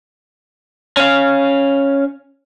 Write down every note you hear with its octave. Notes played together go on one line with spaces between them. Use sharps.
C#4 F5